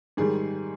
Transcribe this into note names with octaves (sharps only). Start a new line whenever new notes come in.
G#2 D#3 G3 G#4